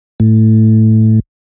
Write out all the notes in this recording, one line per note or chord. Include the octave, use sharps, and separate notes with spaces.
A2